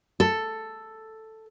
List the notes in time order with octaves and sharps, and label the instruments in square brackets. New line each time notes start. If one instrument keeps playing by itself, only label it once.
[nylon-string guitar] A4